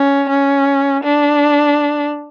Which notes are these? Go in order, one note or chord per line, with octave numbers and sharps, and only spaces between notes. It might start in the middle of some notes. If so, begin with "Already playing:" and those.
Already playing: C#4
C#4
D4